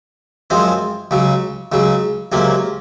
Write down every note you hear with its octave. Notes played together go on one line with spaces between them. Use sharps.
F#2 F3 G#3 C4
C#2 C#3 F#3
C#2 C#3 F#3
C#2 C3 F#3 A#3 C#4